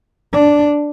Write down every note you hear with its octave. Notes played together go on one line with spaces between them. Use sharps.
D4